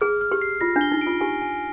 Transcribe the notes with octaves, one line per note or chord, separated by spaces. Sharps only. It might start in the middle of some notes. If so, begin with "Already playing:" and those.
G#4 F6
F6
G4
C7
F4 A#6
D4
G7
D#4
D7
F4
G4 G#5
G#5